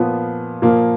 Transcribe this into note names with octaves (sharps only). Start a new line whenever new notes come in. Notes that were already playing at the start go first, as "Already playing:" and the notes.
Already playing: A#2 F3 B3
A#2 F3 A#3